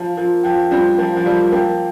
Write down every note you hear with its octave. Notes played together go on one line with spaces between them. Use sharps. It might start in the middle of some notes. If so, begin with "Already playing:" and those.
Already playing: F3 F4
F3 A#4
F3 G5
G3 C4 F4
F3 A#3 F4
F3
G3 A#4
F3 A#3 G5